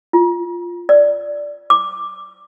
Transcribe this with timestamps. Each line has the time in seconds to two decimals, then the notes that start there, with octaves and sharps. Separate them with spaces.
0.13 F4
0.89 D5
1.70 D6